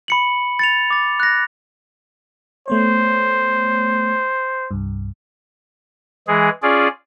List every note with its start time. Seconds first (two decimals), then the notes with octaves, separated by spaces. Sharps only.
0.08 B5 C#7 F#7
0.59 A6 C#7 F7
0.90 D6 A6
1.20 F#6 A#6
2.68 A3 B3 C5 C#5
4.71 C2 G2
6.28 E3 G#3 G#4
6.62 C#4 F4 G#4 D5